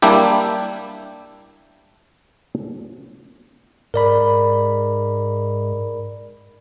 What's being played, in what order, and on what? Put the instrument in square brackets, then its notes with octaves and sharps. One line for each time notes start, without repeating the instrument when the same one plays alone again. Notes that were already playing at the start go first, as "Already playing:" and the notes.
[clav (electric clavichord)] G3 A#3 D4 E4 G4
[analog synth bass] G#2 [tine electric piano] A#4 D5 B5